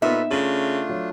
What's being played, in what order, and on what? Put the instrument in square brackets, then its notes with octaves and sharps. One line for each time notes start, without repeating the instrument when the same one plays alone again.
[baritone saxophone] A#2 [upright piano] B3 D#4 [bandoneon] A4 B4 [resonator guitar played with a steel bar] E5
[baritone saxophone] C#3 [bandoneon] A3 D4 F4 [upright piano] A6 F#7
[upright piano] F#3